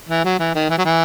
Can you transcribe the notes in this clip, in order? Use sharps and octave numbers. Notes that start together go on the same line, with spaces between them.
E3
F#3
E3
D#3
E3
F#3
E3